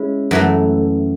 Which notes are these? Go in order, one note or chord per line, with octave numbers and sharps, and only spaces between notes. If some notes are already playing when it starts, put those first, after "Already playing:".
Already playing: G#3 C#4 E4
F#2 E3 A3